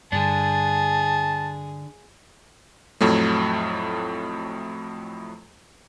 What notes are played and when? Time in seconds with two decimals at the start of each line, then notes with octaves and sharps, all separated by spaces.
0.12 G2 D3 D4 G#4 A5
3.01 F2 A2 F#3 A3